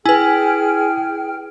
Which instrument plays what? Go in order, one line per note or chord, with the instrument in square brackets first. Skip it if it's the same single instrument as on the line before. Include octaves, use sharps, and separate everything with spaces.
[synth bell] E4 B4 [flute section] G#4 G5 F6 [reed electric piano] G#5